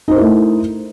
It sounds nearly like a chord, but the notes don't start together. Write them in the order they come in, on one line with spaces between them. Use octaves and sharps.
D#4 C5 A#4 E4 A3